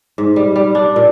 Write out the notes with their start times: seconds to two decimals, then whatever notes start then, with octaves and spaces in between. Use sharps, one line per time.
0.18 G#2
0.36 G3
0.56 G3
0.75 D4
0.96 A#2